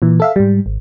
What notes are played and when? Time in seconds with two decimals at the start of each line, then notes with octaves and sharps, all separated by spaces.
0.02 A#2 E3
0.20 A4 E5 F5
0.36 G#2 G3
0.66 G#1